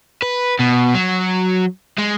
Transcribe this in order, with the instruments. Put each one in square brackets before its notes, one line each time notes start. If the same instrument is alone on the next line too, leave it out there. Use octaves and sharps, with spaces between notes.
[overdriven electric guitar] B4
B2
F#3
G#3